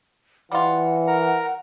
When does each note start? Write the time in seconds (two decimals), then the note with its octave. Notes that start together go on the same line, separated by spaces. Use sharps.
0.52 E3 G3 F4 F#5
1.07 A#4 A#5